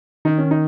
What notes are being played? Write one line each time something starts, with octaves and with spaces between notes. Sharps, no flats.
D#3 D#4
C#4
D#4